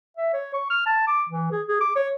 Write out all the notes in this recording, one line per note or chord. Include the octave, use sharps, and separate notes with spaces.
E5
C#5
C#6
F6
A5
D6
E3
G#4
G#4
D6
C#5